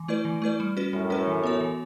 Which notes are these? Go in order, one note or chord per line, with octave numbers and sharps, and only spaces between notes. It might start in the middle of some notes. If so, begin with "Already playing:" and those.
Already playing: E3
A3 E4 B4 D5
E3
A3 E4 B4 D5
G3
C#4 F#4 B4
F#2 A2 G3
C#4 F#4 B4
E3
B3 F#4 C#5
E3